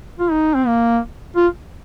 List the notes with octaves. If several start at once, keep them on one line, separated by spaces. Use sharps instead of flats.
F4
D#4
C4
A#3
F4